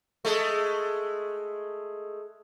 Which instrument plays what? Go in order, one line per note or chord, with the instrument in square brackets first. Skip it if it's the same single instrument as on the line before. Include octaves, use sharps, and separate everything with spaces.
[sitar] G#3 A3